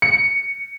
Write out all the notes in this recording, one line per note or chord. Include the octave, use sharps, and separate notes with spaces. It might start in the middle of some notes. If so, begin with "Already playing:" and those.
C#7